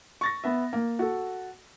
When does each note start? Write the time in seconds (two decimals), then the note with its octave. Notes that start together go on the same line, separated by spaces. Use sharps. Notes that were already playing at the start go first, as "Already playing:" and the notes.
0.21 C#6 A6 A#6
0.44 B3 E5
0.73 A#3
0.99 F#4 A4